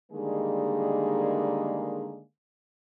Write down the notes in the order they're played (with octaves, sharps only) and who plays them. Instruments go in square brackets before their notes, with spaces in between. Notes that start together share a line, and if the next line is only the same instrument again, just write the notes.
[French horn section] D3 D#3 G3 G#3 A#3 G#4